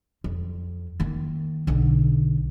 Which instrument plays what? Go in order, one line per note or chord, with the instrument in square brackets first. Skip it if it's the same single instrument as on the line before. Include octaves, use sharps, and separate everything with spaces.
[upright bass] F2
D#3 A#3
B1 D3